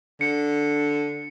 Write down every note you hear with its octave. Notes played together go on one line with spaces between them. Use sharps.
D3 C#7